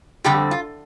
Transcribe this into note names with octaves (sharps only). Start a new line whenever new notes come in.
F2 D3 G3 C4 G4
F4